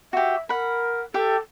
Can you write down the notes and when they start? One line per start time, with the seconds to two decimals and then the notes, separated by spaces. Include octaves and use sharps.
0.13 F#4 G4 E5
0.49 A#4 F#5 B5
1.14 G4 A4 E5 G5